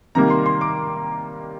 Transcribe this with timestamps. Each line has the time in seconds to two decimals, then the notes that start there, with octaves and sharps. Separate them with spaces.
0.15 C3 D#3 G3 A#3 A#5
0.30 C6
0.46 C6
0.61 D6